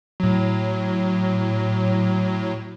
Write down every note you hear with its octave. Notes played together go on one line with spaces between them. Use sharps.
A2 F#3